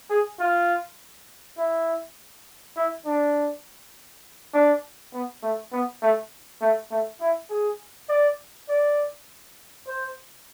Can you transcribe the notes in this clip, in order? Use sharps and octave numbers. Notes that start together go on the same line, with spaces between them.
G#4
F4
E4
E4
D4
D4
B3
A3
B3
A3
A3
A3
E4
G#4
D5
D5
C5